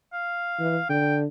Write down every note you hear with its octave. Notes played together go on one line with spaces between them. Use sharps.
F5
E3
D3 G5